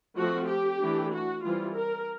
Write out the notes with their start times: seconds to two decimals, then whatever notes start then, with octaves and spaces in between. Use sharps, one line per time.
0.16 F3 A3 C4 F#4
0.49 G4
0.80 E3 A3 D4
1.12 F#4
1.44 E3 G3 C4 F4
1.76 A#4